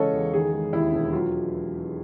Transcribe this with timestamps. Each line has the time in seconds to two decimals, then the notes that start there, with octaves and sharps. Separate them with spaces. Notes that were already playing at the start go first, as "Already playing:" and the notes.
Already playing: C#3 E3 G#3 A4 C#5 D#5 F5
0.13 E2
0.33 D#3 G#4
0.53 G#3
0.73 D#2 E4
0.93 E1
1.12 F#3 F4